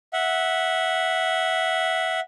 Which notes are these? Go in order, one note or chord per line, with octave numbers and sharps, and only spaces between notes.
E5 F#5